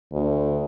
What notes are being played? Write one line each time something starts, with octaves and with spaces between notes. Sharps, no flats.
D2